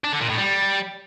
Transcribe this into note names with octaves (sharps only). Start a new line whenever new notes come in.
D4
D3
A#2
A2
G3